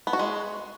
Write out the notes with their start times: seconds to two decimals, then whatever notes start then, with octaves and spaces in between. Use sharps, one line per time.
0.07 B3
0.13 F#4
0.19 G#3